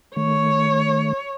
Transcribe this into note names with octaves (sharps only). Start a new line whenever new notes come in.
D#3 A3 C#5